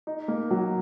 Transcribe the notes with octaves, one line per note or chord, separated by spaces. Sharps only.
D#4
A#3
F#3